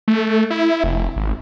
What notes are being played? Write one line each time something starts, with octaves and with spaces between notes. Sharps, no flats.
A3
E4
F1
G#1